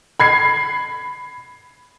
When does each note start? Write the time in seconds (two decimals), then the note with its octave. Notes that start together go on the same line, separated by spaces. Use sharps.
0.20 B5 G#6 C7